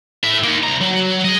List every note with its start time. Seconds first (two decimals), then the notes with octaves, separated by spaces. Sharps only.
0.24 A2 E5
0.43 A#3 D#4
0.63 C2 A#5
0.81 F#3
1.25 G#4 D#5